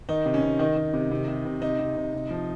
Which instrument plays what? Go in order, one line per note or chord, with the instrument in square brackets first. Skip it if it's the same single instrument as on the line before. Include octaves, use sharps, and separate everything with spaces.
[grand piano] D#3 D#4
C3
C#4
C3
D#3 D#4
D#3
C3
C3
C3
C3
C3 D#4
C3
C3
C3
F3